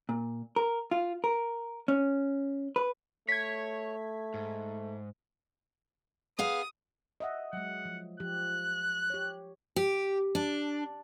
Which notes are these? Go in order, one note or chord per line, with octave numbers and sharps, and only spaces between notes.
A#2
A#4
F4
A#4
C#4
B4
A3 C#5 G#6 B6
G#2
B3 G#4 F5 D#6
D#5 E5 F#5
F#3 G#3 F#5
F3
F3 G4 F#6
G4 C#5
G4
D4